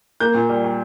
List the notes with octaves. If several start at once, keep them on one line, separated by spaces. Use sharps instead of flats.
A#3 G6
A#2
G3
G3